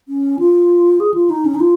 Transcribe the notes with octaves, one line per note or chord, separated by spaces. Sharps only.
C#4
F4
G#4
F4
D#4
C#4
D#4
F4